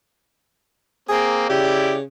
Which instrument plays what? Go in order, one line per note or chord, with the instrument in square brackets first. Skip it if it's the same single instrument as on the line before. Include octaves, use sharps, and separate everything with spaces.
[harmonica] A#3 C4 [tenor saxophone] G#4
[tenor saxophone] C#3 [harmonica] E4 G4 D5